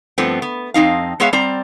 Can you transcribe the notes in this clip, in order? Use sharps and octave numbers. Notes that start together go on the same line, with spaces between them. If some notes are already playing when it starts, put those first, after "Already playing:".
G2 F3 A3 B3 C4
B3
F2 C4 D#4 F5
G#3 B3 G#4 C#5 E5 F5
G3 C4 D5 A#5